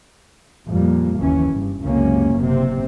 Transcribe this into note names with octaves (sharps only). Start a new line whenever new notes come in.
F2 A#2 G3 A#3
F#1 D#2 E3 C#4
G2
C#2 F#2 C3 A#3 C#4
F#1 C3 C4